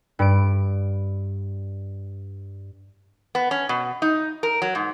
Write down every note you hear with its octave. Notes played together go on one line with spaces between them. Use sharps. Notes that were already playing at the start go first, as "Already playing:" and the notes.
G2 D7
B3
C#4
B2
D#4
A#4
F#3
G#2